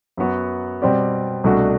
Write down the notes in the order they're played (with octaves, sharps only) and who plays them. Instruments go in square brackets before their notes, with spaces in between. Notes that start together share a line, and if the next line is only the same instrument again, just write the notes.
[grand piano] F#2 F#3 B3 F#4
B2 G3 C4 G4 D5
C2 B2 A3 D4 F#4